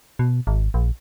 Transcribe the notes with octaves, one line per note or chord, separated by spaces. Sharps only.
B2
G#1
A#1